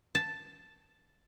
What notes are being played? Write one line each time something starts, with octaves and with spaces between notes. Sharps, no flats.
A5